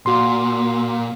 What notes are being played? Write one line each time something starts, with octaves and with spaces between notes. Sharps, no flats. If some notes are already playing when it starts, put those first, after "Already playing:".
A#2 F#4 C6